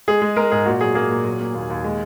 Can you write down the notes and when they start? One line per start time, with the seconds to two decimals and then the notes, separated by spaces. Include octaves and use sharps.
0.08 G#3 G#4
0.22 G#3
0.36 G#3 A#4
0.52 G#2 G#4
0.66 A#2 F#4
0.81 F#3 G#4
0.95 A#3 G#4
1.10 A#2
1.25 F#3
1.41 A#3
1.55 D#2
1.70 D#2
1.84 G#3